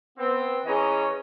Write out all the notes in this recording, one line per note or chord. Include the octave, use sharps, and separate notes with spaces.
B3 C4
E3 C#4 G#4 C#5 D#5 A#5